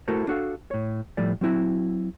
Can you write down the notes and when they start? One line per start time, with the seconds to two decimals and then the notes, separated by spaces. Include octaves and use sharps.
0.08 A3 E4 F#4 A4 A#4 C5
0.28 D4 F#4 A4 F5
0.71 A2 C#5
1.17 A2 F3 G3 A3 D5
1.41 F#3 C4 E4 F#4